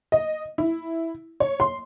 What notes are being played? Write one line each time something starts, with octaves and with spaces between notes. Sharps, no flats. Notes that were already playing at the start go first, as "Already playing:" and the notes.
D#5
E4
C#5
C6